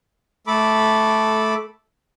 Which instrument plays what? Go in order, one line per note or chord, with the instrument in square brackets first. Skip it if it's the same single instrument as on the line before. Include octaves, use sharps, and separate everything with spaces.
[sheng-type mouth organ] A3 A4 B5 D6